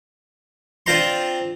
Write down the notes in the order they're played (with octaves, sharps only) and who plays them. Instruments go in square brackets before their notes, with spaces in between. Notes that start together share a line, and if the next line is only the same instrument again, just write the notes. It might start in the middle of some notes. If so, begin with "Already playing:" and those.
[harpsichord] C4 D4 F4 C5 A#5 C6